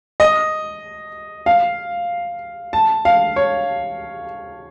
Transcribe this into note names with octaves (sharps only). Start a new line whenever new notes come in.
D#5
F5
A5
F5
C#5